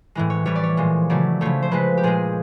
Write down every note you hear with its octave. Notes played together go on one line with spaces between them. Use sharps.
A2 E3 G#3
C#5
A2 E3 G3 C#5
D5
C#5
A#2 F3 G#3
C#3 F#3 A3 D5
C#3 F3 A3 C#5
C5
C#3 F3 G#3 B4
G4
A#2 F3 G#3 G#4